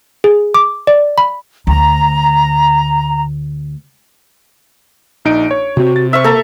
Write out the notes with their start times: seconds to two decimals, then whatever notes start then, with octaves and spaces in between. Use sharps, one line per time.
0.24 G#4
0.54 D6
0.87 D5
1.18 B5
1.67 D2 A#5
5.25 A#1 D#4 D7
5.51 C#5
5.77 C3 C4 F#4
5.96 A6
6.13 C5 E5 C#6 F6
6.24 A#3 A4 A#5